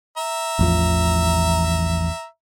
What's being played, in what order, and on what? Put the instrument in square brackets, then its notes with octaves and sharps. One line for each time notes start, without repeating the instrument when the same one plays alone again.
[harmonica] E5 A#5
[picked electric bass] A1 E2 F3